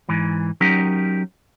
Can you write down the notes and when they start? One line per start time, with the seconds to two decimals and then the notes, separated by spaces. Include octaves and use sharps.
0.09 G#2 E3
0.61 F#3 C#4 D#4 G4 A#4